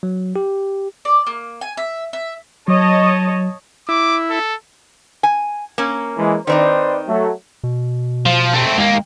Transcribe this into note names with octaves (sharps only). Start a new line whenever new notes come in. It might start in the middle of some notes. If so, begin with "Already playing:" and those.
F#3
G4
D5
A#3
G#5
E5
E5
F#3 C#5 D#5 A5
E4 D6
A4
G#5
A#3 C#4
E3 G#3
D#3 C4 D#4 B4 C5 D5
F#3 A3
B2
F3
A3 C4
D#2 G#3 A#3